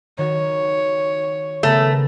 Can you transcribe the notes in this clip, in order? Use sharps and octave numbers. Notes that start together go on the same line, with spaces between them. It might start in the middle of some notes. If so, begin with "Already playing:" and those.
D#3 F#4 C#5
C#3 A3 B3 A#4